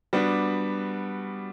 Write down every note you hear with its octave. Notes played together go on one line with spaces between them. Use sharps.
G3 B3 D4 F#4